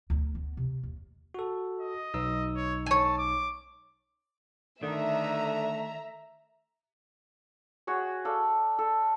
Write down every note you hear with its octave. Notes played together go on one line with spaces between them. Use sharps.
D2
B3
C3
D#2
F#4 A4
D#5
B1 D#4 E6
C#5
C#5 G#5 A5
D6
D3 D#3 A3 E5 A#5
F#4 G#4 C#5
A4 D5 F5
A4